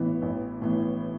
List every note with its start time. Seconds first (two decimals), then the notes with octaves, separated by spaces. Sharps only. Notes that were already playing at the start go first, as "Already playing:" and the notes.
Already playing: A1 A2 E3 B3
0.22 A1
0.62 A2 E3 B3